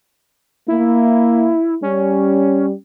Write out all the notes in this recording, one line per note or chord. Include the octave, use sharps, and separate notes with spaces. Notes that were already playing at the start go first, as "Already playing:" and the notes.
A#3 E4
G3 C#4